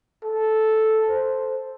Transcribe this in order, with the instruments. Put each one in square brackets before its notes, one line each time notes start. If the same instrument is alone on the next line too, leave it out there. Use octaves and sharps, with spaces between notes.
[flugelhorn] A4
C5